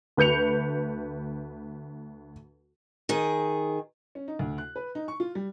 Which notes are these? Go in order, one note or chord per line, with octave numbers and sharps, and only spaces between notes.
D2 B4 G6 C#7 F7
D#3 G#4
C#4
D#4
D2
F#6
B4
D#4
C#6
F4
G3